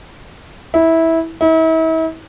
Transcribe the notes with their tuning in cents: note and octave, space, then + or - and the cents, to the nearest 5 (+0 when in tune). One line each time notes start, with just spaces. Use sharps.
E4 -15
E4 -40